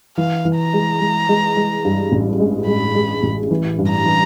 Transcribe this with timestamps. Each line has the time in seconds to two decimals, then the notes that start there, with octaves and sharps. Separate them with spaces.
0.18 E3 F5
0.45 E3
0.59 A#5
0.74 G#3
1.01 G#3
1.29 G#3
1.56 G#3
1.84 G2
2.12 A1
2.40 G#3
2.67 G#3 B5
2.95 G#3
3.23 A1
3.51 E3
3.78 G2
3.92 A#5
4.05 E3